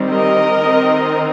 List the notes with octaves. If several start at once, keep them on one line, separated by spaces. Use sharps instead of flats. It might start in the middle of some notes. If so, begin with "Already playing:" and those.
Already playing: D#3 G3 C4
A#4 D#5
D#3 C4